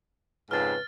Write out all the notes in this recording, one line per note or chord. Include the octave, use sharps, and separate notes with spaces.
F2 G#2 C#3 B4 F6 A6